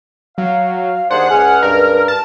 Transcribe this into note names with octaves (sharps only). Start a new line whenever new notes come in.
F#3 F5
D#2 D4 G#4 C5 F#5
C#2 G#4 F6
G2 A#4
A5